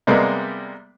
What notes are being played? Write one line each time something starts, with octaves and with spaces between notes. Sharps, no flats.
C3 G3 G#3 A#3 B3